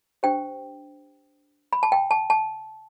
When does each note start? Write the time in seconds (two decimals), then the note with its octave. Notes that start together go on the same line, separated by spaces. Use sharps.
0.23 D4 G4 C5 G5
1.73 B5
1.83 A5
1.92 G5
2.11 A5
2.30 A5